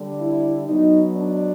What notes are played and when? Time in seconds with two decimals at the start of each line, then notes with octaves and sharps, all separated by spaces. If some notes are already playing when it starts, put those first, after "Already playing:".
Already playing: D3 G3
0.18 E4
0.66 B2 F#3 D#4
1.15 D4